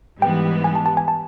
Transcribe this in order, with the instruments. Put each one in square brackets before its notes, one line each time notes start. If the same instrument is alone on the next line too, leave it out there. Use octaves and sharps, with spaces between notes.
[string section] G#2 E3 G3 B3 [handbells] G5
[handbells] G#5
A5
A5
G#5
A5